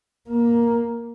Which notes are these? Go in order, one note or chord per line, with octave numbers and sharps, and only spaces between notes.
A#3